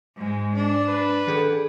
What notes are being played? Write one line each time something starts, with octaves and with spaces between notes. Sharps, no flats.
G#2 G#3
D4
B4
D#3 G#4 A4